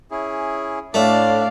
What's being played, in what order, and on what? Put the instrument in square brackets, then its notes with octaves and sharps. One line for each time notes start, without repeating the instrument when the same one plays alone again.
[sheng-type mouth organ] C#4 E4 G#4
[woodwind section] A2 [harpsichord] A3 [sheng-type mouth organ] D4 [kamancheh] D5 F5